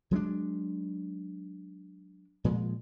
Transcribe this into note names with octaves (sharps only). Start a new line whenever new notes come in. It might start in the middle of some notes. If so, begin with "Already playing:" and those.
F#3 G#3 C#4 D4
A#2 F3 G#3